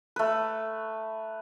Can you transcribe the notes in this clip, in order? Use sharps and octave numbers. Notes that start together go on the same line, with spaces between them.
A3 B4